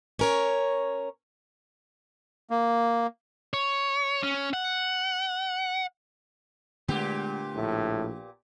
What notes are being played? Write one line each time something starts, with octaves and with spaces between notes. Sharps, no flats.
C#4 A#4 C#5
A#3
C#5
C#4
F#5
A#2 D3 G#3 A3 B3 D4 G4
A#1 A2